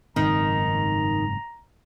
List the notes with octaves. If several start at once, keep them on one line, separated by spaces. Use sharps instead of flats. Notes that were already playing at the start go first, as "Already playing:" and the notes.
F#1 G#2 D#3 C4 A#5